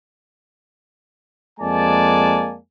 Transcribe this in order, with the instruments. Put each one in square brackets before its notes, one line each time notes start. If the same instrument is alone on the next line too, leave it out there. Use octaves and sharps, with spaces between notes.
[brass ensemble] F2 G#3 A#3 D5 G#5 A5